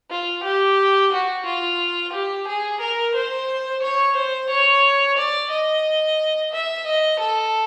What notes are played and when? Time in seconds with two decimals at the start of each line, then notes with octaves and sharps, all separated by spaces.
0.10 F4
0.44 G4
1.13 F#4
1.46 F4
2.13 G4
2.48 G#4
2.80 A#4
3.15 C5
3.82 C#5
4.16 C5
4.50 C#5
5.18 D5
5.51 D#5
6.53 E5
6.87 D#5
7.20 A4